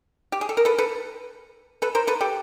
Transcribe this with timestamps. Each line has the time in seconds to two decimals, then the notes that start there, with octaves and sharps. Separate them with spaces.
0.32 G4
0.41 G#4
0.49 A4
0.57 A#4
0.65 A4 B4
0.78 A4 B4
1.82 A4 B4
1.95 A#4 C5
2.07 A4 B4
2.21 G4 A4